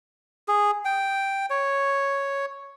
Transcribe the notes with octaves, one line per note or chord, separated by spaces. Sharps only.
G#4
G5
C#5